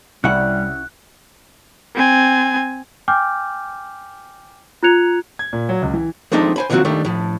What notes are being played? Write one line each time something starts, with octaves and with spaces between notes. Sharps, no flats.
C2 G3 C#4 E4 F#5 F#6
C4 G#5
G5 G#5 D6 F6 G6
F4 A#5 F#6 G#6 C#7 F7
G#6
A#2
F#3
C#2
E3
F3 G#3 A3 C4 D4 D#4
C5 G#5 B5
D3 D#3 F3 F#3 C4 F#4
D#3 G3 A3 D4
A2 F3